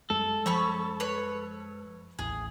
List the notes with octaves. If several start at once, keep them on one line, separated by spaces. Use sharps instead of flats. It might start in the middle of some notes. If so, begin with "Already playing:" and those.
F#2 G3 G#3 A4
F3 C#4 B5 C#6
B4 C#5
A1 D#2 A2 G#4